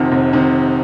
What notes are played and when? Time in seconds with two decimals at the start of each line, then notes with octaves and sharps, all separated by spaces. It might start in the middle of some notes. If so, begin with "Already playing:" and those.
Already playing: F1 F2 C3 D#3 F#5
0.12 F1
0.33 C3 D#3